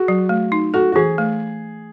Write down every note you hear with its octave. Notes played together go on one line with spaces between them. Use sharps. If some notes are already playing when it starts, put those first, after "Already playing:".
Already playing: F#4 G#4
F#3
A3
D#4
F#4 A4
F#4
E3 G#4
A3